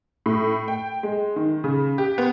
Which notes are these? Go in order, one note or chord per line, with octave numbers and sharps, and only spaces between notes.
A2
G5
G#3
D#3
C#3
G4
B3